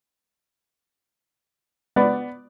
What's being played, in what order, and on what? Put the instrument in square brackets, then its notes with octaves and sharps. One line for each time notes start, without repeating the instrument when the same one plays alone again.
[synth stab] G#3 D5 [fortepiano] B3